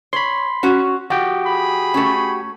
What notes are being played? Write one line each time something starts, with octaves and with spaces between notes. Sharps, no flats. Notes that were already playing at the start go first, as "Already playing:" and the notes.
C#5 B5 C6
C#4 F#4
F3 F#4 G4 G5
G#4 B5
A3 C#4